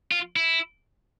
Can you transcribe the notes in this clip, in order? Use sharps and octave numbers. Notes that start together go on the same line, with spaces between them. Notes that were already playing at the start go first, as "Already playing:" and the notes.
F4
E4